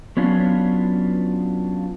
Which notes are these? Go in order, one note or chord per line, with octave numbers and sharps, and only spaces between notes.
F#3 B3 C#4 D4 F4